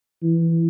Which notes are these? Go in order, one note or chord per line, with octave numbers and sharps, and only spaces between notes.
E3